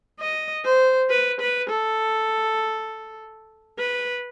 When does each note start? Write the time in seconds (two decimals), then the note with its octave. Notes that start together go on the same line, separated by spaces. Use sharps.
0.20 D#5
0.65 C5
1.10 B4
1.40 B4
1.70 A4
3.78 B4